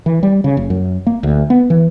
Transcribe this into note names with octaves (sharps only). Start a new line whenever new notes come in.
E3
G3
C#3
F#1
F#2
A#3
D2
B3
E3